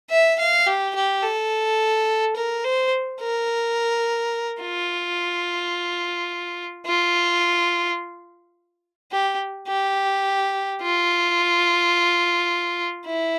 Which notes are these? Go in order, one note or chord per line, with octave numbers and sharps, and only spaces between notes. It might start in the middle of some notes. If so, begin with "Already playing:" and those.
E5
F5
G4
G4
A4
A#4
C5
A#4
F4
F4
G4
G4
F4
E4